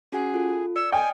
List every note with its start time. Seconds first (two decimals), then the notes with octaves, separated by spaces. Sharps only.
0.12 C#4 F#4 G#4 F#5
0.34 F4 A4
0.76 D5 E6 C#7
0.92 D#5 G5 G#5 D#6 F6